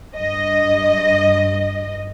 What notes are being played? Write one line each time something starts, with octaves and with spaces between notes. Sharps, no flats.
G2 D#5